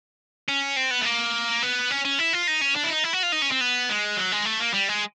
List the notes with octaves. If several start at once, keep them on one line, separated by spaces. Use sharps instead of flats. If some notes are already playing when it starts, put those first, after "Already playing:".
C#4
C4
B3
A3
A#3
B3
C#4
C#4
E4
F4
D#4
C#4
D4
E4
D#4
E4
F#4
F4
D#4
C#4
C4
B3
G#3
F#3
G#3
A3
A#3
G3
G#3